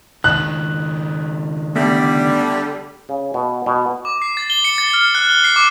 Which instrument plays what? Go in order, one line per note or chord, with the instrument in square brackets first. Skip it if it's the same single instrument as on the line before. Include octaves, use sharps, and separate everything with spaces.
[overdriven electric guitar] C#2 D#3 [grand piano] F#6
[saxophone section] D3 G3 [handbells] A3 B3 B6
[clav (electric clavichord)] C#3
B2
B2
[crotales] D6
C7
A6
G7
C#7
A6
F6
F#6
G7
C7
D6